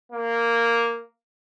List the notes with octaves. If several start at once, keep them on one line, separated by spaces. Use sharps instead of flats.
A#3